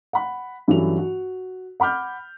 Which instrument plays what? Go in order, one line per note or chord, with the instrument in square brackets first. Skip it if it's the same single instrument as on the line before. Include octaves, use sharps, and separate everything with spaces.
[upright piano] F#5 B5
G2 E3 F#3 C#4 A4 F7
F#4
F#5 B5 D6 F6 G6